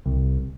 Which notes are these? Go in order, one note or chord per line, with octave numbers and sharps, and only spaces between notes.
C2